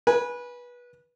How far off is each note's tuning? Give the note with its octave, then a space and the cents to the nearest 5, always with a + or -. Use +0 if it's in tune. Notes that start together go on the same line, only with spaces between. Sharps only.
B4 -20 G#5 +0